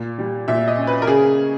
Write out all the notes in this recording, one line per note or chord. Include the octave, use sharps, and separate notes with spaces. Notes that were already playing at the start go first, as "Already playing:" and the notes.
Already playing: A#2
G3
A#2 E5
D#5
C#4
B4
A#4
C#3 G#4